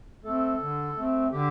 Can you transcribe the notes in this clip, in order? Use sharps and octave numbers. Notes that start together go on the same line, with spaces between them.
A3 C4 A4
D3
A3 C4
D3 G4